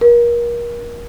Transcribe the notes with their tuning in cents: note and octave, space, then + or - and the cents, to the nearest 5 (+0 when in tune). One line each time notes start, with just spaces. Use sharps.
A#4 +30